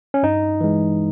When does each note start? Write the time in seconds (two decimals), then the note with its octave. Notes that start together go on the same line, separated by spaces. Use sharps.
0.14 C#4
0.23 G2 D#4
0.61 E3 G#3